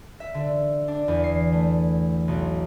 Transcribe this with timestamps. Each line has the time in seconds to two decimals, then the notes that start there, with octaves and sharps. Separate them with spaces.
0.20 E5
0.34 D3
0.88 D4
1.08 E2
1.24 C7
1.53 A3
2.28 B1